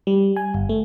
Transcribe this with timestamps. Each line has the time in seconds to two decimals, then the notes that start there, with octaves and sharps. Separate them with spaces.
0.07 G3
0.36 G#5
0.54 G1
0.69 A3